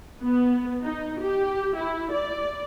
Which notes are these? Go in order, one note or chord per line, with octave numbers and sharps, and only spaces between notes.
B3
D#4
G4
E4
D5